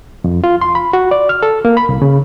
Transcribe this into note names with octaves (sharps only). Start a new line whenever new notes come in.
F2
F4
C6
B5
F#4
D5
F6
A4
A#3
B5
C2
C#3